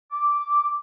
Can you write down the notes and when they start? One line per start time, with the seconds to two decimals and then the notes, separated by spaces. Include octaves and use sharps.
0.11 D6